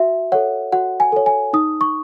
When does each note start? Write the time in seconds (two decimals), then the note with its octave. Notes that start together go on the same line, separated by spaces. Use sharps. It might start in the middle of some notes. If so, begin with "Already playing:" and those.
Already playing: F#4 E5
0.32 A4 C#5 F#5
0.72 F#4 F#5
1.00 G#5
1.12 A4 C#5
1.26 G#5
1.53 D#4 D#6
1.81 C#6